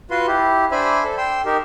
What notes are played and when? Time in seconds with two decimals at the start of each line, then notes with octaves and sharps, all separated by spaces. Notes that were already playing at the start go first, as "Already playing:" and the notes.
0.11 F4 F#4 B4 C6
0.27 E4 G4
0.71 D4 C5 E5 G#5 B5
1.04 A4
1.18 G5 C6 E6
1.46 D#4 G4 A#4